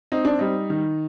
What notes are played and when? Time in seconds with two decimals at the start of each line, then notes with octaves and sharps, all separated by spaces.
0.12 C4 D#4
0.25 D4
0.39 G3 D#4
0.70 D#3